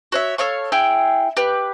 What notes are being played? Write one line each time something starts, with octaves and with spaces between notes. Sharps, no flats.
F#4 C#5 E5
A4 C#5 F5 C#6
E4 G#4 G5
G4 B4